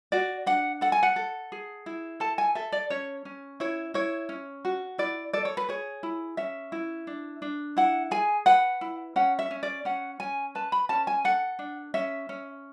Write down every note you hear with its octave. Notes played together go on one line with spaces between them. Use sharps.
F#4 D5
D4 F#5
A4 F#5
G#5
F#5
A4
G#4
E4
A4 A5
G#5
A4 E5
D5
C#4 C#5
C#4
E4 C#5
E4 C#5
C#4
F#4
E4 D5
A4 D5
C#5
B4
G#4 C#5
E4
C#4 E5
E4
D4
D4
E4 F#5
G#4 G#5
B4 F#5
E4
C#4 F#5
E5
C#4
D5
C#4 F#5
C#4 G#5
B4 A5
B5
C#4 A5
G#5
A4 F#5
D4
C#4 E5
C#4